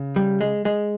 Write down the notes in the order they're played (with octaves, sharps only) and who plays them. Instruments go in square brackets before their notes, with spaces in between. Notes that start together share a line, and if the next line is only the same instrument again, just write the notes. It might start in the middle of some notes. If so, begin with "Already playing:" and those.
Already playing: [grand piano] C#3
[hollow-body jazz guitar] G3
G#3
G#3